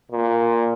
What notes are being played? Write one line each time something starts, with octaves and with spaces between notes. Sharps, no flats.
A#2